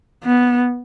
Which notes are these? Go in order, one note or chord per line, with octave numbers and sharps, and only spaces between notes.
B3